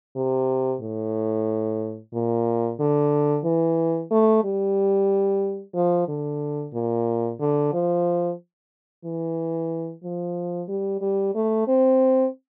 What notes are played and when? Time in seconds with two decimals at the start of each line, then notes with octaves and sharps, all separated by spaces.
0.16 C3
0.81 A2
2.14 A#2
2.80 D3
3.44 E3
4.11 A3
4.44 G3
5.75 F3
6.08 D3
6.74 A#2
7.40 D3
7.73 F3
9.05 E3
10.04 F3
10.68 G3
11.01 G3
11.35 A3
11.68 C4